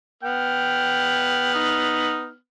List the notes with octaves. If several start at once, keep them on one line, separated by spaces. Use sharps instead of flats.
B3 G5 F6
D#4